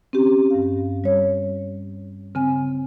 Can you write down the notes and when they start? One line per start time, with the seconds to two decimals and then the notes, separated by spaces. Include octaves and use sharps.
0.13 C4 C#4 G4
0.50 G2 F5
1.04 G3 C#5
2.35 C#3 C4 G#5